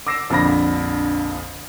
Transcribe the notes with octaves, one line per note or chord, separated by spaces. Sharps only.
D6 E6 A#6 C7 D7 E7
A#1 F2 D3 B5 A#6